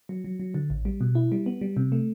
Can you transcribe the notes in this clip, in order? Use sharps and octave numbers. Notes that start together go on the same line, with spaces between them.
F#3
F#3
F#3
D3
A1
G3
B2
E4
G3
B3
G3
C3
A3